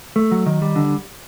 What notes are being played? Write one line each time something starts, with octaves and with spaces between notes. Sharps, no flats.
A3
F#3
D#3
G3
D3